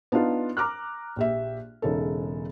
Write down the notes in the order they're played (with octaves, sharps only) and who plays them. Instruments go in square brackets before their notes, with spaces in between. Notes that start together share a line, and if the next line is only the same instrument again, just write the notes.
[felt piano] B3 D4 D#4 F4
A#5 D6 F6 F#6
A#1 G4 E5
E1 C#3 D#4 A4